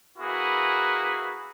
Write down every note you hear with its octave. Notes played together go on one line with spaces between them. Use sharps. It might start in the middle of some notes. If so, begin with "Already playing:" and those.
A#3 E4 F#4 G#4 B4